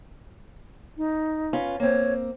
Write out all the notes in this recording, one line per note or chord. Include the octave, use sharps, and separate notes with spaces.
D#4
C#4 F4 B4
A#3 C4 C#5